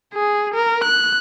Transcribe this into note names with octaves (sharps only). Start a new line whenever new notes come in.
G#4
A#4
F#6